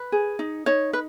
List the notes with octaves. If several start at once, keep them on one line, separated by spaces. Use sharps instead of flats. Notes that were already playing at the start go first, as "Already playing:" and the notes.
Already playing: B4
G#4
D#4
D#4 C#5
B4